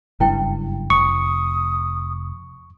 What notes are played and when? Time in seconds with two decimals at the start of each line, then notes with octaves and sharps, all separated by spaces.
0.20 F#1 G2 C#4 E4 G5
0.90 F1 C#6 D#6